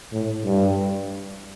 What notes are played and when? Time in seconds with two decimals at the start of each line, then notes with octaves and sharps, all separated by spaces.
0.12 A2
0.45 G2